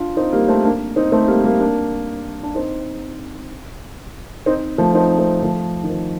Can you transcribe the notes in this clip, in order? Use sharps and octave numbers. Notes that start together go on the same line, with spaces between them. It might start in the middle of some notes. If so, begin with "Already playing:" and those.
Already playing: D4 F4
C4 D#4
G3 A#3
A3 C4
A#3 D4
C4 D#4
A3 C4
G3 A#3
G3 A#3
A#3 D4
D4
C4 D#4
C4 D#4
F3 A3
C4 D#4
A3 C4
F3 A3
D#3
F3